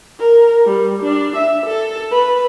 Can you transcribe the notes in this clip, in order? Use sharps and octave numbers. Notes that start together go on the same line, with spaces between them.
A#4
G3
D4
E5
A4
B4